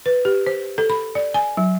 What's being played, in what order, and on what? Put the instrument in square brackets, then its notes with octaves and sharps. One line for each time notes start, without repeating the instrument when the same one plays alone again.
[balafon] B4
G4
C5
A4
B5
D5
G#5
F#3